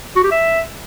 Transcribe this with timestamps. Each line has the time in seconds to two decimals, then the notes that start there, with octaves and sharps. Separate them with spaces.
0.16 F#4
0.24 G4
0.31 E5